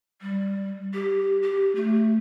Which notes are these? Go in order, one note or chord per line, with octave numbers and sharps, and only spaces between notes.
G3
G4
G4
A3